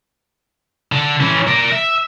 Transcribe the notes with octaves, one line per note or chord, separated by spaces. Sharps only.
D3
E3 C#4
A#4 D5
E5